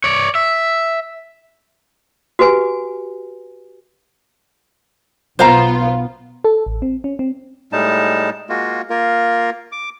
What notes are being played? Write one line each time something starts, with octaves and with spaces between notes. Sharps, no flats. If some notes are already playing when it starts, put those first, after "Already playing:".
C#5 D5
E5
F#4 G4 B4 G#5
B1 B3 F4 C5 F5 A#5
A4
A1
C4
C#4
C4
A2 G3 G#3 D#4 A5
G#3 A#3 F4 F#4
A#3 F4 A#4
D6